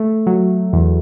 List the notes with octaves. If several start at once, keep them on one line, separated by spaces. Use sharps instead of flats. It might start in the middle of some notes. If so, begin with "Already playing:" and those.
Already playing: A3
F#3
E2